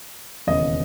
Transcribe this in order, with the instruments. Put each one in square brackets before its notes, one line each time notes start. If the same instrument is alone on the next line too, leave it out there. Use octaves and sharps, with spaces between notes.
[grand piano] E1 D#2 C#3 D#5